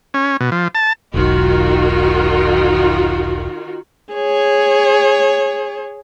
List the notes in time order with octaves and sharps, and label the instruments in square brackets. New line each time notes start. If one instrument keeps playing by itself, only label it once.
[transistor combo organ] C#4
B2
F3
A5
[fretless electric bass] E1 B1 [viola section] D#3 F4 F#4
[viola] G#4 C#5